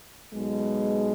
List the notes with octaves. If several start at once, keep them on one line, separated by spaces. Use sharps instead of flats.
B1 B2 G#3